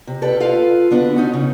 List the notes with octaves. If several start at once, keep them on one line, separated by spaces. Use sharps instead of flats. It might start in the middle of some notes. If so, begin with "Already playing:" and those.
C3
G4 A4 B4 D5
F4 A4 B4 F5
D3 B3 D4 F#4
C#4 D#4 F#4
C#3